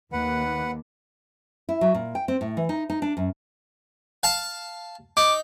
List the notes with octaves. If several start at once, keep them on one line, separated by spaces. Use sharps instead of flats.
D#2 B4 F#5
E4
F#3
A#2
G5
C4
A2
E3
D#4
D#4
D4
F#2
F5 A5
D#4 D6